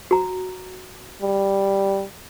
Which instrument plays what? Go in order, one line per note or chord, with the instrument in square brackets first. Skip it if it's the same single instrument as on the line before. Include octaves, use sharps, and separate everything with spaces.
[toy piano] F#4 A#5
[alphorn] G3